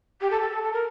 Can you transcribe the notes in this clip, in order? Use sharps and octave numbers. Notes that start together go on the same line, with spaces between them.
G4
A4
A4
A4
A4
A#4